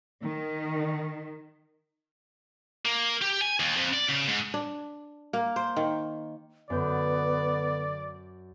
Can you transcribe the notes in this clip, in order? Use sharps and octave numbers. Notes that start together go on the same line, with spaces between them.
D#3
A#3
G4
G#5
D#2
F2
D5
C#3
G#2
D4
A#3
C5
D#3
F#2 D3 B3 D5 G6